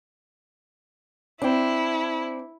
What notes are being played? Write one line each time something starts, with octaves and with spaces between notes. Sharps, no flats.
C4 D4 E4